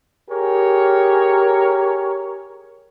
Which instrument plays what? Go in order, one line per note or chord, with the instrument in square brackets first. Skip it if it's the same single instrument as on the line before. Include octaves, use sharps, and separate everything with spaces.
[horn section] G4 G#4 A#4 C#5